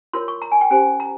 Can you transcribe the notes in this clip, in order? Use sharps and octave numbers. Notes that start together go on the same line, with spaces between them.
F4 A#4 C#5 C6
C#6
A#5
G#5
G5
C#4 G4 C5 G#5
A#5